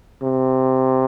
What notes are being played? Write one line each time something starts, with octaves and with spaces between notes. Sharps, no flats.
C3